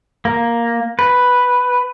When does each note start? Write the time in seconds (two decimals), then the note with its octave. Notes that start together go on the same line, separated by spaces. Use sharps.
0.25 A#3
0.99 B4